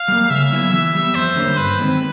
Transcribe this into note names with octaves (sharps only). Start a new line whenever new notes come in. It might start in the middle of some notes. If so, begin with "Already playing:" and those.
Already playing: F5
G3 A#3
C#3 E5
F#3 B3 E4 G#4
E3 E5
G3 B3
F2 C5
D3 G3 A#3 C#4
G2 B4
D#3 G#3 C4